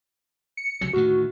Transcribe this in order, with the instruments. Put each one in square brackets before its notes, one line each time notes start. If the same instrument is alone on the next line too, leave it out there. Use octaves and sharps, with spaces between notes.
[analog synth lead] C#7
[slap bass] C#2 C3 F#3
[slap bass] D2 A2 D#3 [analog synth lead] F#4